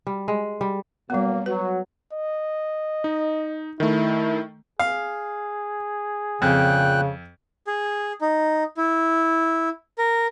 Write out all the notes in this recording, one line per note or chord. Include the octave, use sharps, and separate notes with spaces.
G3
G#3
G3
B2 F#3 G3 A#3 B3
F#3 B4
D#5
D#4
D#3 A3 E4
G#4 F5
F2 A#2 C#3 G5 F#6
G#4
D#4
E4
A#4